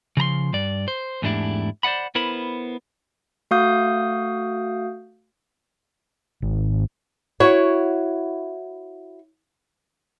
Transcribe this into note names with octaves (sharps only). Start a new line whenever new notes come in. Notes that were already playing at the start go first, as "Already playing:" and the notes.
C#3 F3 A#5 C6
G2 D5
C5
E2 G#2 A3 D4 E4 G4
C5 D5 D#5 F#5 B5
B3 E4 A#4 C5 B5
A3 F#4 F5 D#6 G6
G#1
E4 F#4 C#5